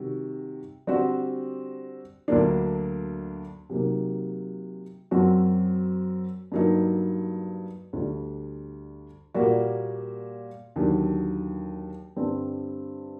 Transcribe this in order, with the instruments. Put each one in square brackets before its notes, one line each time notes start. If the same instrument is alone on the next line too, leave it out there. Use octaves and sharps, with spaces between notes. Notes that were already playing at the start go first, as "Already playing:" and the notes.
Already playing: [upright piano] C3 D#3 G3 F#4
D3 G3 C4 F#4
D2 D3 F#3 A#3 D4
C3 F#3 A#3 D#4
F#2 F#3 C4 F#4
G2 F#3 A#3 D#4
D2 D3 G3
A#2 G3 A#3 F#4
D#2 D3 F#3
G2 D3 G3 C4